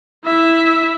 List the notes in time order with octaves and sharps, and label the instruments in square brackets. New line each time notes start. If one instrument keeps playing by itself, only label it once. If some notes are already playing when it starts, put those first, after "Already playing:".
[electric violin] E4 E5